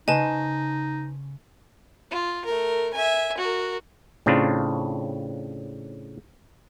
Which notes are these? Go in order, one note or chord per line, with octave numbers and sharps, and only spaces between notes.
C#3 C#4 D#4 B4 C5 D#5 G#5 A5
F4
A3 A#4
E5 G#5
F#4 A#4
A2 C#3 C4 D4 F4